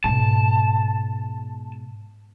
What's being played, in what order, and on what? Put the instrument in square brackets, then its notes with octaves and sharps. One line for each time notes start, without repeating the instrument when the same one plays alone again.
[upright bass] G#2 B2 [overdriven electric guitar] A5